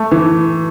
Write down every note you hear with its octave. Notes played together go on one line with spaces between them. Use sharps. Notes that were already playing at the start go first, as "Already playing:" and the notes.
Already playing: A3
E3